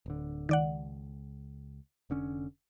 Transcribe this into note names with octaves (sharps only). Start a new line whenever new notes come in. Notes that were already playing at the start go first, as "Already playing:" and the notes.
D1 D3
C#2 D#3 D5 F#5
F1 D3 C#4